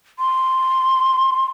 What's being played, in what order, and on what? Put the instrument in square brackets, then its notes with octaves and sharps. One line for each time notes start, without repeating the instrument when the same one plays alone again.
[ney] C6